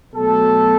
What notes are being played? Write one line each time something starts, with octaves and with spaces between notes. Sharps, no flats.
B2 F#3 A3 A4